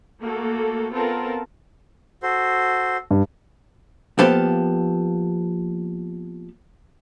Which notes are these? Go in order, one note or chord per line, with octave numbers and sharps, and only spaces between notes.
A3 A#3 F#4 A4
B3 C4 F4 A4 A#4 A5
F#4 A4 C5
G2
F3 A#3 B3 G4 A4